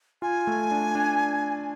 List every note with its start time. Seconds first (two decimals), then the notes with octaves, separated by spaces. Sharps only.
0.22 F4 G#5
0.47 A3
0.71 D4
0.95 D4